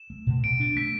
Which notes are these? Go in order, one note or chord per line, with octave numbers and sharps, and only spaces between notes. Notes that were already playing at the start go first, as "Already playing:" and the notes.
Already playing: E7
A3
B2
B2 D7
D4
A3 B6